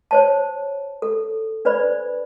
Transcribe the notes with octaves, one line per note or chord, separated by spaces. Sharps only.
C5 C#5 A5
A4
D4 B4 C5 D5 B5